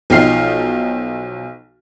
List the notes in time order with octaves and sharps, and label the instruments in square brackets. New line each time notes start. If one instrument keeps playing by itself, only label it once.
[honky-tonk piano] B1 F3 D#4 G5 F6 C7